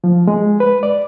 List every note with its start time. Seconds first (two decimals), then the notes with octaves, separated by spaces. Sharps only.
0.04 F3
0.27 G#3
0.60 B4
0.83 D5